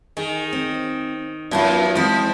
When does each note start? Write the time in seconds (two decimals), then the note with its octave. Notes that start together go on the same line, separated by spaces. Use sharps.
0.17 D#3 G#4
0.53 C4
1.51 F#2 F3 B3 F4
1.95 F3 G#3 C4 E4